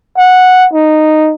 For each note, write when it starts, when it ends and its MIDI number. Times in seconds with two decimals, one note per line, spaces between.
0.18 0.67 78
0.73 1.34 63